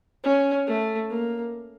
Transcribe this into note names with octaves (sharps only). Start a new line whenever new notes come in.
C#4
A3
A#3